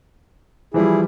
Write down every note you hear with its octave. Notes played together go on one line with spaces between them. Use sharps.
E3 F3 G3 E4 G#4